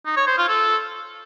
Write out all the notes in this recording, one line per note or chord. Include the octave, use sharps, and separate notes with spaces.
D#4
C#5
C5
F4
A4